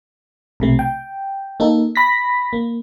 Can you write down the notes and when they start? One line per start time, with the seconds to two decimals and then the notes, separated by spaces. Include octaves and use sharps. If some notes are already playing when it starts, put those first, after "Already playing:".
0.60 B1 C3 A3
0.79 G5
1.60 A#3 D#4 A4
1.96 B5 A#6 B6
2.53 A#3